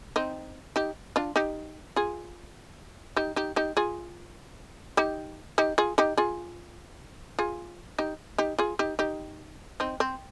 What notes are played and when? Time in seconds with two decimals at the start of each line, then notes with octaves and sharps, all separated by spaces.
0.16 C4 D#4
0.76 D#4 G4
1.16 D4 F4
1.36 D#4 G4
1.96 F4 G#4
3.16 D#4 G4
3.36 D#4 G4
3.56 D#4 G4
3.77 F4 G#4
4.97 D#4 G4
5.58 D#4 G4
5.78 F4 G#4
5.98 D#4 G4
6.17 F4 G#4
7.39 F4 G#4
7.98 D#4 G4
8.38 D#4 G4
8.58 F4 G#4
8.79 D#4 G4
8.99 D#4 G4
9.80 C4 D#4
10.00 C4